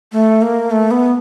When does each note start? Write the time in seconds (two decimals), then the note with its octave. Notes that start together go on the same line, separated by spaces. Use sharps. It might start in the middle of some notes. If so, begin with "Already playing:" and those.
0.12 A3
0.42 A#3
0.71 A3
0.91 B3